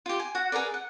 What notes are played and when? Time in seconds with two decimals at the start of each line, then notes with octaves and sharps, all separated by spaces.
0.06 F4 G4
0.19 G#5
0.35 F#4 F#5
0.52 G#4 A#4 B4 D5
0.74 F#5